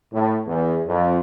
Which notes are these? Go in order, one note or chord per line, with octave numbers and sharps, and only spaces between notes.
A2
E2
F2